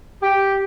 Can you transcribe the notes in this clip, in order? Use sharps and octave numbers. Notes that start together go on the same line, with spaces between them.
G4